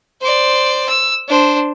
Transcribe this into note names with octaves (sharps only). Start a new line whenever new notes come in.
C5 D5
E6
D4 C5